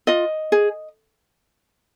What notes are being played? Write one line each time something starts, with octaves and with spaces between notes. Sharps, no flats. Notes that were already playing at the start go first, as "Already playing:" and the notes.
F4 D#5
G#4